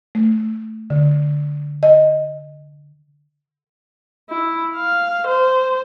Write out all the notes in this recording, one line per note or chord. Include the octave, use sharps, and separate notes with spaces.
A3
D3
D#5
E4
F5
C5